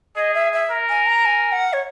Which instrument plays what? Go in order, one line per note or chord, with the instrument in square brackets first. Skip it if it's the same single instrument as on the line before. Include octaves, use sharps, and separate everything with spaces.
[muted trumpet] G#4 [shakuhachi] D#5
[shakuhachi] E5
E5
[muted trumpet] A#4
[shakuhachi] G#5
A#5
G#5
F#5
C#5